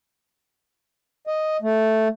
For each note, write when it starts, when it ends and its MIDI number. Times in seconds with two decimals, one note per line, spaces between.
1.27 1.57 75
1.62 2.08 57